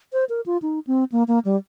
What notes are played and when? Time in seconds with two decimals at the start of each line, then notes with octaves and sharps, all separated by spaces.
0.13 C5
0.29 A#4
0.46 F4
0.62 D#4
0.87 C4
1.12 A#3
1.28 A#3
1.45 G3